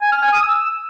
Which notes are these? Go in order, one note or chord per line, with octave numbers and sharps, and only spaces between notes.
G#5
F6
G#5
D#6
E6